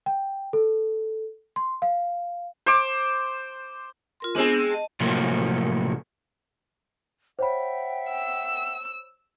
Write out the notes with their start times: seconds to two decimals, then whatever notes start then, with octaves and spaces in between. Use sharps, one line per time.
0.06 G5
0.53 A4
1.56 C6
1.82 F5
2.66 C5 D6
4.20 F4 A#4 C6
4.35 G#3 B3 C4 D4 G#4
4.70 D#5 A5
5.00 A2 C3 F3 F#3 A3 A#3
7.39 C5 C#5 E5 F#5 G5 B5
8.11 E6